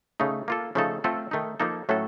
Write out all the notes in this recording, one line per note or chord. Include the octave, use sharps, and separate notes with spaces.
C#3 A3 D#4
A#3 F4 A4
C#3 F3 A3 D#4 A4
A3 C4 F4 A4
D#3 A3 D#4
F3 A#3 D#4 A4
A2 F#3 A3 C#4 A4